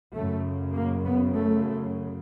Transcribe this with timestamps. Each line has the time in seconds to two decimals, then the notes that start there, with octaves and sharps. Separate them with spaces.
0.14 F#2 C#3 A3
0.75 A#3
1.05 B3
1.35 A3